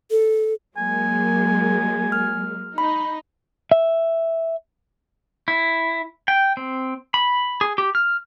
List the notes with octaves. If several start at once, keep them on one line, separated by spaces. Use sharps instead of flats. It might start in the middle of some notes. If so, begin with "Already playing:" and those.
A4
F#3 G#3 A#3 G#5
F6
D#4 B5
E5
E4
G5
C4
B5
G#4
G4
F6